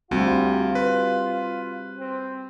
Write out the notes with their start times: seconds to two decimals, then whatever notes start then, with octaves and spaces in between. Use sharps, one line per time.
0.11 D2 G3 C4 F4 F#4
0.75 B4
1.98 C4